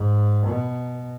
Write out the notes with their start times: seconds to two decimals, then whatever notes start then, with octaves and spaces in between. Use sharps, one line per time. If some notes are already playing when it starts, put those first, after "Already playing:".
Already playing: G#2
0.46 B2